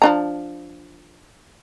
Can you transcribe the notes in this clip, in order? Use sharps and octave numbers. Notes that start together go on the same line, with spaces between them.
F3 D4 A#5